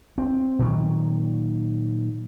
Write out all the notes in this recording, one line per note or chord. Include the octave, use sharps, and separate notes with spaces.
C4
A#2 D#3 F#3